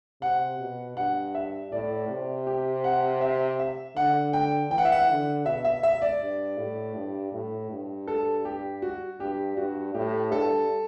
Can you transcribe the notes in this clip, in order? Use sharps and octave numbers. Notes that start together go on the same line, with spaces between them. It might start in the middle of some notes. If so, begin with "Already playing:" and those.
C3 F#5
B2
G2 F#5
E5
A2 D5
C3
G4
F#5
E5
E5
D3 F#5
G5
E3 G5
F#5
E5
F#5
D3
B2 E5
E5
E5
D5
G2
A2
G2
A2
G2
A4
G4
F#4
G2 G4
G2 F#4
A2 G4
G2 A4